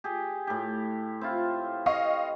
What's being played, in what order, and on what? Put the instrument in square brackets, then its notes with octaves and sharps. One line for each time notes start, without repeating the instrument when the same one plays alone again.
[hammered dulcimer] G4 G#4
A2 G4
C4 E4 F4
[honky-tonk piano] D#5 F5 C#6